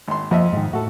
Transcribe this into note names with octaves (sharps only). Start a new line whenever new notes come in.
G#1 C6
F2 F3 D#5 E5
G#2 D#3
A2 F#4 A4